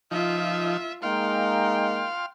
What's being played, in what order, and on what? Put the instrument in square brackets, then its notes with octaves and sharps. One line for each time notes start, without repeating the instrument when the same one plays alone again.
[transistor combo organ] F3 D#4 [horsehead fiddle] F4 E5
[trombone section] G#3 A#3 D#4 [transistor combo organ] F5 C6 [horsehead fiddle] G5